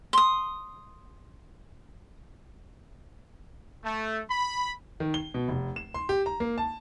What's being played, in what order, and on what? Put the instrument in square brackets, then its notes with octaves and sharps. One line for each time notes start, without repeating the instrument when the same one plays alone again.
[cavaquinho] C6 D#6
[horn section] A3
B5
[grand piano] D#3
G7
B2
F1
E7
C6
G4
A#5
A#3
A5